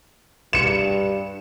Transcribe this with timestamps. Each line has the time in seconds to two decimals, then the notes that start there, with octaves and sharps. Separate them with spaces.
0.53 G2 C#7 E7